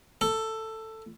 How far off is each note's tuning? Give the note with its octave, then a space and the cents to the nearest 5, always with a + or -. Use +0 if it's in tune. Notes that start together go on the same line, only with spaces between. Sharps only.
A4 +10